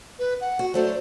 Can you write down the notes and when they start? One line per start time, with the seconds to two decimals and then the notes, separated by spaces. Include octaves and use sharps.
0.19 B4
0.41 F#5
0.59 F#4
0.74 F#3 A3 D4 C5